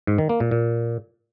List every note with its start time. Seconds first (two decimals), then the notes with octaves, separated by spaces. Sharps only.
0.07 G#2
0.18 D#3
0.29 A#3
0.40 A#2
0.51 A#2